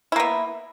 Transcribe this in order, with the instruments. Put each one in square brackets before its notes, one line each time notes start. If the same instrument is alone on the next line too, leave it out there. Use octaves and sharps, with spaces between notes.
[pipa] E4
A#3
B3